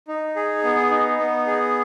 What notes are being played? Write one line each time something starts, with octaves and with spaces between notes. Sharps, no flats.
D#4
G#4
B3
D#4
B3
G#4